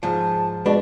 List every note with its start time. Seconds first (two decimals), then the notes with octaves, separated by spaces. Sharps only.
0.03 G#2 F3 A5
0.66 B2 G#3 D4 A5 B5